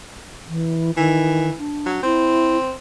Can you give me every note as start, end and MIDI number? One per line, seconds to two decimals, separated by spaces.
0.48 0.91 52
0.97 1.50 51
0.97 1.54 52
1.58 2.02 62
1.86 2.00 54
2.03 2.73 60
2.03 2.56 64